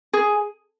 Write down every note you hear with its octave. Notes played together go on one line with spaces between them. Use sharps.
G#4